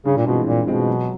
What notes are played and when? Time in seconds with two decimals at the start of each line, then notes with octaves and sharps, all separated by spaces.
0.05 G2 C#3
0.17 A#2
0.26 B2 E3 G#3 C4 F4
0.46 G2 A#2
0.67 B2 E3 G#3 C4 F4
0.87 F#3